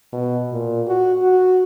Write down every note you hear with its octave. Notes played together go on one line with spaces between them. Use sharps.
B2
A#2
F#4
F#4